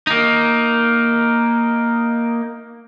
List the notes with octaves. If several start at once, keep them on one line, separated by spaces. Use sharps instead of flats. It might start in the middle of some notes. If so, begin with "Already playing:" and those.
A#3 D#4